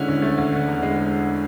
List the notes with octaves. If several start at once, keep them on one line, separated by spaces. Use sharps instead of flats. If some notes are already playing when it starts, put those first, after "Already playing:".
Already playing: D3 G#3 C#4 E4
D2
A3
D2
D3
E2
G#3